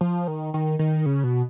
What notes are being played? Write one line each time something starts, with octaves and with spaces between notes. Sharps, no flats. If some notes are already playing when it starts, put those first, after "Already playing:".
F3
D#3
D#3
D#3
C#3
B2